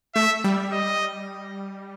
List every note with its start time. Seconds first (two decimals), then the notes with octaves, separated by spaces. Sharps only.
0.15 A3 E5
0.44 G3
0.72 D#5